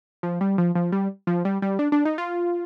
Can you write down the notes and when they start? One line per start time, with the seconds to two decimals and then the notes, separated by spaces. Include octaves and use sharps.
0.23 F3
0.41 G3
0.58 F3
0.75 F3
0.92 G3
1.27 F3
1.45 G3
1.62 G3
1.79 D4
1.92 D4
2.05 D#4
2.18 F4